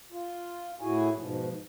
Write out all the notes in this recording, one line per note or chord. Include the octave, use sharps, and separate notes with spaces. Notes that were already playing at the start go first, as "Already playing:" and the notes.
F4
A2 E4 F#4 G#4 G#5
G#2 B2 F3